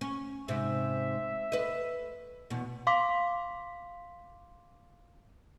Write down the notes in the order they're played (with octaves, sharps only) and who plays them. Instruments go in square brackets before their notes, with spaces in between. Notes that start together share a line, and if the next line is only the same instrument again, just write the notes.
[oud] C#4
[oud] G#2 C3 [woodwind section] E5
[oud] B4 D#5
E2 B2
[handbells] F5 C6 D6 B6